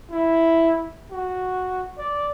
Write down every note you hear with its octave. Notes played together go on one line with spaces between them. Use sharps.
E4
F#4
D5